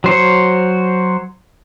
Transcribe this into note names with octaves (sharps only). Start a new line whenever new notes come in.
F#3 C5 C#5